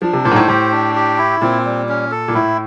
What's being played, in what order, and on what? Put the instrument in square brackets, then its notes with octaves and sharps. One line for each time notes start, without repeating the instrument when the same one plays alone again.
[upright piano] F3 [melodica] D4
[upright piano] C3
[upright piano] A#2 [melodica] C5
[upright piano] G#2
A2
[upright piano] A2 [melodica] G4
[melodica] D4
G4
E4
[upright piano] A#2 [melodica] C4
[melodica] G3
C#4
A4
[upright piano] A#2
[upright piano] A2 [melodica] E4